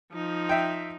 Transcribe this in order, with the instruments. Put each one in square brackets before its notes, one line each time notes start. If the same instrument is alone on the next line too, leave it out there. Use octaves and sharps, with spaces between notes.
[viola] F3 D#4
[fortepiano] E5 G5